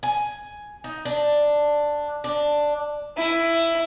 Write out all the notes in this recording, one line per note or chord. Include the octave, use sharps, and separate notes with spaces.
G#5
D#4
D4
D4
E4